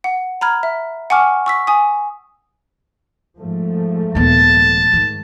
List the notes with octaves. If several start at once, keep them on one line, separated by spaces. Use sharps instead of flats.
F#5
A#5 B5 F6 G#6
E5
F#5 G#5 A5 C#6 D6 F6
C#6 E6 B6
G#5 D#6
G#2 F3 A3
D#1 B3 A5
G#2 D#3